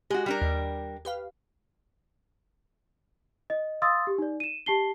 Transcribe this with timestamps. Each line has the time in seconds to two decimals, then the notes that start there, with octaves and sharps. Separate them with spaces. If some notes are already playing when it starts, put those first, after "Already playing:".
0.10 G#3 F#4 G4
0.26 G3 D4 A#4
0.42 D#2
1.05 G4 B4 F5
3.50 D#5
3.82 F5 C6 D#6 E6 A6
4.07 G4
4.18 D#4 D5
4.40 D#7 E7
4.66 G4 A5 C7 G7